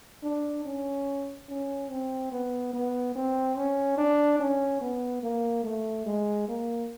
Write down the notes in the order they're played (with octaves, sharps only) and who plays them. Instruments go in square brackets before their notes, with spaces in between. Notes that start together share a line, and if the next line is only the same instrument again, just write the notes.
[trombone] D4
C#4
C#4
C4
B3
B3
C4
C#4
D4
C#4
B3
A#3
A3
G#3
A#3